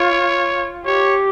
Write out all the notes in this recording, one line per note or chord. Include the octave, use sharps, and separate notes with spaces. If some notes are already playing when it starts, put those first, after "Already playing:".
Already playing: F4 C#5
G4 C#5